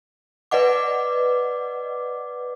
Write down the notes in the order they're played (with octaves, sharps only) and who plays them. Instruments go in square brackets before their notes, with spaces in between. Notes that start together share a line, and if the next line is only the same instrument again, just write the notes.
[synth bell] B4 D5 D#5 F#5 D6